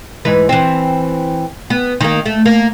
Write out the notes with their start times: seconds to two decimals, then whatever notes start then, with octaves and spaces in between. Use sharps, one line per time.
0.25 G#2 E3 B4
0.49 E3 C4
1.70 B3
2.01 D#3 A#3
2.26 A3
2.46 A#3